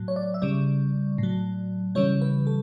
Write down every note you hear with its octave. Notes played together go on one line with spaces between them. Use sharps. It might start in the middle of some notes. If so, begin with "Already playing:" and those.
Already playing: A2 F#3
C#5
D5
E5
C#3 G3 D5
A2 F#3
C#3 E3 G3 C#5
B4
A4